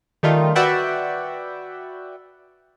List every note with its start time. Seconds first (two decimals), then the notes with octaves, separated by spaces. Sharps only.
0.23 D#3 G3 A3 D#4 F4
0.55 F#4 B4 D5 E5 F#5 G5